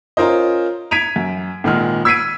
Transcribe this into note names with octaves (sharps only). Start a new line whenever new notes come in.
C#4 F4 A#4 C5 D#5
G#6 B6 D7 D#7 F7
F#2
G#1 A#2 D#3 G#3 F6
E6 G#6 B6 C7 D7 D#7